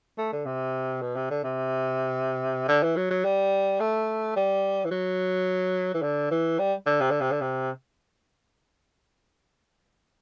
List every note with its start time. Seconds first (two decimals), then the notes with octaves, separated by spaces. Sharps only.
0.18 A3
0.32 D3
0.46 C3
1.02 B2
1.16 C3
1.30 D3
1.44 C3
2.68 D3
2.83 E3
2.96 F#3
3.11 F#3
3.25 G3
3.80 A3
4.36 G3
4.85 E3
4.91 F#3
5.94 E3
6.02 D3
6.31 E3
6.59 G3
6.86 D3
7.00 C3
7.10 D3
7.21 C3
7.31 D3
7.41 C3